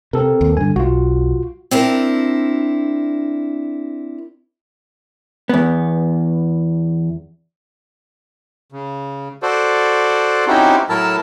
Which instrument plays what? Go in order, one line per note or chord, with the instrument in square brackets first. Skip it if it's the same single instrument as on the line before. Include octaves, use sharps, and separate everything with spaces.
[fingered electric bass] C3 [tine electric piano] C4 A4 A#4
[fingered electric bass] D#2
[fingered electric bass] G2 D3 [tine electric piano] G#5
[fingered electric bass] B1 [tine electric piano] F4 F#4
[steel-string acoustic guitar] C4 D4 E4 A#4
[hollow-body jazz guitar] E2 B3
[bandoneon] C#3
F#4 A4 C5 D5
C4 C#4 D#4 E4 F#4 G4
A2 F#3 E4 A#4 A5 E6